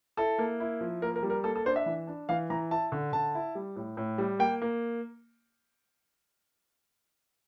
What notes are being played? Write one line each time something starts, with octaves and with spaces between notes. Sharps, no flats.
E4 A4
A#3
E4
F3
A#3 A#4
A#4
G3
A#4
A#3 A4
A4
D4 C5
E5
E3
D4
E3 F5
E3 A#5
E4 A5
D3
D3 A5
E4
G3
A2
A2
G3
A#3 G5
A#3